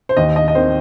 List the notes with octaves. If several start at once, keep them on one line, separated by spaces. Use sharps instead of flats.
C5
D#2 D#5
D#5
D#5
D#3 C4 C5